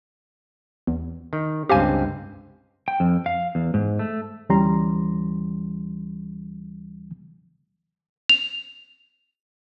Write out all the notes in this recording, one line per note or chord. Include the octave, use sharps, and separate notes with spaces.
E2
D#3
C#2 G2 C4 G4 F5 G#5
G5
F2
F5
E2
G#2
A3
D2 E3 G3 C#4 A#5 C6
F7